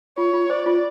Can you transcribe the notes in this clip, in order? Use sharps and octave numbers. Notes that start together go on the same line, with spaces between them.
F4 C#5
F4
C5 D5
F4